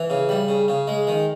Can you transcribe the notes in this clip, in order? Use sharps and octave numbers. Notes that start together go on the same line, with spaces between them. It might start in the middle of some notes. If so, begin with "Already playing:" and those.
Already playing: E3
C#3
G3
C#3
C#3
G#3
D#3